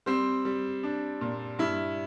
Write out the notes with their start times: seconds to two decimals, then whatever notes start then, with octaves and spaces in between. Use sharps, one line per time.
0.06 G3 C4 C5
0.45 G3
0.83 D4
1.21 A#2
1.59 G2 E4